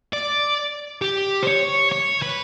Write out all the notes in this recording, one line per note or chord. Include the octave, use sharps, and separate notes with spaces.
D5
G4
C5
C#5
C#5
B4